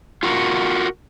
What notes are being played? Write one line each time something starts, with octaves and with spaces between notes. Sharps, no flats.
F4 F#4 A#4